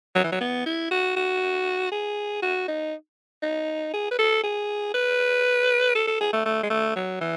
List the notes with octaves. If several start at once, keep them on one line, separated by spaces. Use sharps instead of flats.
F#3
E3
F#3
B3
E4
F#4
F#4
G#4
F#4
D#4
D#4
G#4
B4
A4
G#4
B4
A4
A4
G#4
A3
A3
G#3
A3
F#3
E3